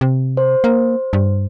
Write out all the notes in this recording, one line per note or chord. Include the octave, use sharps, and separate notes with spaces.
C3
C5
A#3
G2